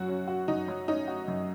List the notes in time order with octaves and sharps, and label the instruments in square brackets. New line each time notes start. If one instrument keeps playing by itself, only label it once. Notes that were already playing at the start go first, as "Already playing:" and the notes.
Already playing: [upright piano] F#2 F#3 [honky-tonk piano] F#4
[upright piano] C#4
F#4
[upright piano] F#2 [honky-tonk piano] D#4
[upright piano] F#3
[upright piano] C#4 [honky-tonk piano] D#4
[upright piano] F#4
F#2